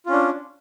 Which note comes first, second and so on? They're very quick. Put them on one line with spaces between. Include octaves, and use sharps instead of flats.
F4 C#4 D4